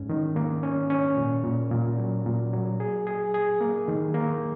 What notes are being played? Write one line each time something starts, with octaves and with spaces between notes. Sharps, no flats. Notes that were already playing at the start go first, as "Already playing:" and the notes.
Already playing: G#2 C#4
D#3
A#3
C#4
C#4
A#2
A#2
A#2
F#3
A#2
F#3
G#4
G#4
G#4
A#3
D#3
A#3